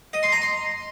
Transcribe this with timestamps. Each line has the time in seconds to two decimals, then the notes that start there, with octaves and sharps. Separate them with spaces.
0.13 D#5
0.23 C6
0.32 A#5
0.42 C6